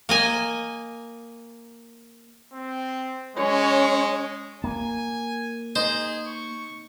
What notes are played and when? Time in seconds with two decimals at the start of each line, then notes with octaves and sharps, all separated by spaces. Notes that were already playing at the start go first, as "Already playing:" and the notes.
0.09 A#3 D#5 G#5
2.53 C4
3.36 G#3 C#4 C#5
4.64 A#3 G#5
5.76 D#4 G#4 C5
6.26 C#6